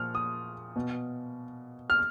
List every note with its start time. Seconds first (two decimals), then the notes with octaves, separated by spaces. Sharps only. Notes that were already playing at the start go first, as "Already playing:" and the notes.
Already playing: A#2 F3 F6
0.15 D#6
0.76 B2
1.90 F6